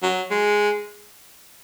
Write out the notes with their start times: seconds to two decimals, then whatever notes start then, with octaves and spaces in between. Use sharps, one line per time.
0.02 F#3
0.30 G#3